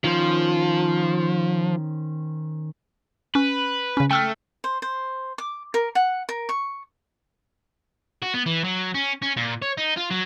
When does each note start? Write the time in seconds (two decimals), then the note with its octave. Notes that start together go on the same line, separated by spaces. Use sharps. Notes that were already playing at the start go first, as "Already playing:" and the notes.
0.04 D#3 F3 C#4 C5
3.35 C#4 B4
3.97 C#3 C#4
4.11 A3 G5 E6 F6
4.64 C5
4.82 C5
5.38 D6
5.74 A#4
5.95 F#5
6.29 A#4
6.49 C#6
8.22 F#4
8.34 B3
8.46 E3
8.64 F#3
8.95 C#4
9.22 C#4
9.37 A#2
9.62 C#5
9.77 D#4
9.97 F4
10.10 F#3